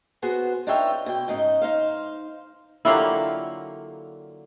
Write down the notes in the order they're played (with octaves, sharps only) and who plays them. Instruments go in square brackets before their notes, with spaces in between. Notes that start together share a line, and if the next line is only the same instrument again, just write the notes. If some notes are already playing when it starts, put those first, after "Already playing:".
[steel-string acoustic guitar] B3 F#4 G#4 C5
D4 D#4 F4 C#5 E5 G5
B2 G5
G#2 C#3 D#4
D#4 C5 F5
[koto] D3 F#3 A#3 [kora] E4 F4 G4